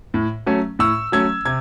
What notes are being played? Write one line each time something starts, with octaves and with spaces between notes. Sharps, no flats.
A2
F#3 A3 C#4
A2 C#6 E6
F#3 A3 C#4 E6 G#6
C3 G#6